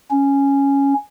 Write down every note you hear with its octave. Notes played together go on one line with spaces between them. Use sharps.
C#4